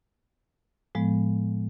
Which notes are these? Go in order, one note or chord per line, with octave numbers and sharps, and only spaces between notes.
A2 F3 G#3 B3